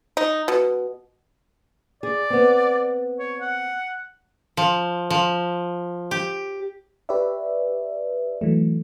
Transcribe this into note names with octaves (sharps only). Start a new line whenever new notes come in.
D#4
B2
G#4 D5
B3 C4
C#5
F#5
F3
F3
G4
G4 B4 C#5 D5 E5
E3 F#3 A3